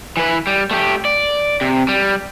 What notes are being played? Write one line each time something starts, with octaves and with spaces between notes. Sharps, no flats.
E3 B4
G3
A3 G4
D5
C3
G3